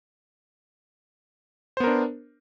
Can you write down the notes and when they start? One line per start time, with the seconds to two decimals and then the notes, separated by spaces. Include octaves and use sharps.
1.77 C5
1.80 B3
1.84 A#4
1.87 D4